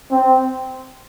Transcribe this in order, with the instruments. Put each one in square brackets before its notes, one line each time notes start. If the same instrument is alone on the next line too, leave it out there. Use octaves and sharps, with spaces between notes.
[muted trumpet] C4